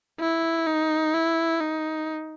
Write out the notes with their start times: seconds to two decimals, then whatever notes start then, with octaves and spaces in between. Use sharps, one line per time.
0.20 E4
0.67 D#4
1.14 E4
1.61 D#4